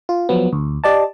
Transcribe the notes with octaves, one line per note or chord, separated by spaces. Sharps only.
F4
F3 F#3 B3
D2
G4 D5 D#5 A5